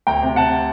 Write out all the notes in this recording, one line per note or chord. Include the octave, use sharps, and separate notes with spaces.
D2 G5 A#5
C3
C3 F#5 A5